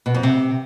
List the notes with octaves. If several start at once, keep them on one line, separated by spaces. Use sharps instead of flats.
B2
F2
C3